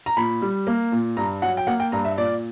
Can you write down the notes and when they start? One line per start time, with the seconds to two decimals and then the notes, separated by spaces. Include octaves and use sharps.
0.06 A#5
0.17 A#2 B5
0.42 G3
0.67 A#3
0.92 A#2
1.17 G2 A#5
1.42 F#3 F#5
1.57 G5
1.67 A#3 F#5
1.80 G5
1.92 G2 A#5
2.05 E5
2.17 A#2 D5